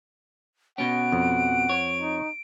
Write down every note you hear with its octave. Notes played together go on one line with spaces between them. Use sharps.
B2 C#4 F#5 D7
F2
C#5
D#4